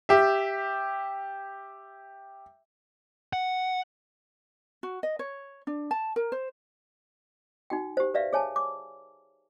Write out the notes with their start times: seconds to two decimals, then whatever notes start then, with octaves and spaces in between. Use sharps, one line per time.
0.09 G4 E5
3.33 F#5
4.83 F#4
5.03 D#5
5.19 C#5
5.67 D4
5.91 A5
6.16 A#4
6.32 C5
7.70 D#4 F#4 G5
7.97 G4 C5
8.14 B4 D5 E5 F5
8.33 G#4 C#5 G#5 A5
8.56 D6